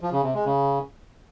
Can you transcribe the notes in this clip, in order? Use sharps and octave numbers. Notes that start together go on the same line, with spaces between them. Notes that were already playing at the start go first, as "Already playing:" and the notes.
F3
C#3
C3
G#3
C#3